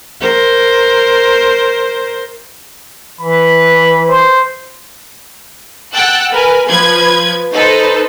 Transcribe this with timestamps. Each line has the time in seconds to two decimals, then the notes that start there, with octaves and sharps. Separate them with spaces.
0.21 A#4 C5
3.20 E3 B5
4.08 C5
5.93 F#5 G5 A5 E6 F#6
6.32 A#4 B4 G#5
6.68 F3 B4 G#6
7.52 D#4 A4 B4 C5